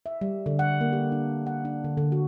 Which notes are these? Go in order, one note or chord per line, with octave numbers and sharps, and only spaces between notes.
E5
G3
D3
F#5
A#3
G4
D4
F#5
D4
D3
D3
F#4